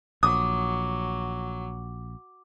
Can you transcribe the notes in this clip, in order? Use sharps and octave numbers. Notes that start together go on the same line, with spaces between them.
A#1 F#3 D6 D#6